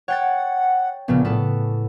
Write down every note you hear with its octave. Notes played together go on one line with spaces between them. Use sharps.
C#5 F#5 G5 A6
A#1 A#2 C#3 B3
A2 B3 A4